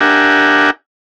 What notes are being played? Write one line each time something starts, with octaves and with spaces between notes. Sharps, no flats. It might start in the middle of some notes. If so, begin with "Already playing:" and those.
D4 G4 A#4 E5 F#5 G#5